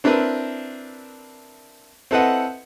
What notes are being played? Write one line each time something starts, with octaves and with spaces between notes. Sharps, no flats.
C4 D4 E4 A#4 B4
C4 E4 A4 B4 D#5 F#5